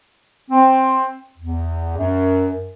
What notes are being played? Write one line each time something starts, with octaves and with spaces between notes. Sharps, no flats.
C4
E2
F#2